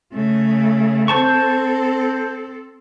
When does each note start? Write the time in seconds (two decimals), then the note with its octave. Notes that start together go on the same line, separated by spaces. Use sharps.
0.13 C#3 A3
1.08 C4 A4 C5 A5 C#6